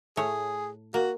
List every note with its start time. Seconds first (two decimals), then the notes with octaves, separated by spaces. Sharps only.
0.17 A2 A3 G#4 C#5
0.94 A#3 F#4